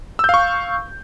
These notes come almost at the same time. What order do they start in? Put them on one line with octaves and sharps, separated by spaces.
E6 G6 F5 C#6